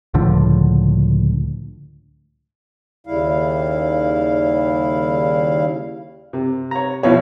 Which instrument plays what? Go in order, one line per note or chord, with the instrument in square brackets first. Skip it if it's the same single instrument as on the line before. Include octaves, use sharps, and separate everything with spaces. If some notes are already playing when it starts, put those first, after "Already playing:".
[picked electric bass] C#2 A2 D3 F3
[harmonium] D#2 C#3 G3 E4 F5
[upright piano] C3
[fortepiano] C#5 A#5
[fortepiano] B2 F3 B3 [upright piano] E4 C#5